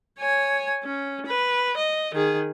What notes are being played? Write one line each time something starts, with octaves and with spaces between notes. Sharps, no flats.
C#5 G#5
C#4
B4
D#5
D#3 G#4